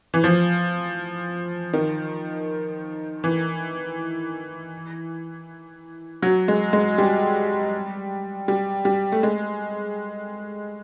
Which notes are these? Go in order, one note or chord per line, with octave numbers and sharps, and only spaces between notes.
E3
F3
D#3
E3
F#3
G#3
G#3
G3
G3
G3
A3
G#3